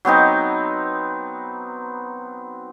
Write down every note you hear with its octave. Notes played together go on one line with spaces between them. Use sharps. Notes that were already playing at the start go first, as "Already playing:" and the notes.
F#3 B3 C4 D#4